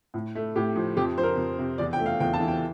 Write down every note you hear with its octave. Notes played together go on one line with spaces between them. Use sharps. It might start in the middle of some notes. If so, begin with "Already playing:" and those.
A2
A3
A2 G4
F3
F2 G4
F3 C5
A#4
F2
C3
E2 D5
G5
A3
F5
E2 G5
A5
E3
G5